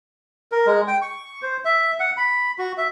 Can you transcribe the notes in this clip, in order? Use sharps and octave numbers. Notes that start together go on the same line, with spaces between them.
A#4
G#3
G5
C#6
C5
E5
F#5
B5
F#4
E5